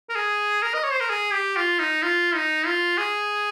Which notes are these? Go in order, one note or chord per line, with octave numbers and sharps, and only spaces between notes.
A#4
G#4
A#4
D#5
C#5
C5
A#4
G#4
G4
F4
D#4
F4
D#4
F4
G#4